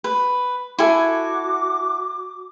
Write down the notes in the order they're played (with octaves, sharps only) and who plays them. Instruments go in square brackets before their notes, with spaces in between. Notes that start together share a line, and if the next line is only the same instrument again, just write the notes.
[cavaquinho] B4
[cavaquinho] E4 A4 G#5 [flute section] F#4 D6